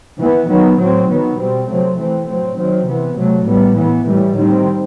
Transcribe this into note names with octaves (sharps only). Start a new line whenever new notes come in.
E3 B3
D#3 F#3 B3
A2 F#3 C4
D#3 F#3 B3
B2 G3 C4
C3 F#3 A3 C4
E3 A3 C4
A2 F#3 C4
D#3 F#3 C4
C3 E3 B3
C3 F#3 A3
A2 G3 B3
E3 B3
A2 E3 G3
D#3 G3 C4